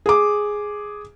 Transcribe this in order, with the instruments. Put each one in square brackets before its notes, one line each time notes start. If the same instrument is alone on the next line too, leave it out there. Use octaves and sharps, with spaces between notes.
[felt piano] G#4 D6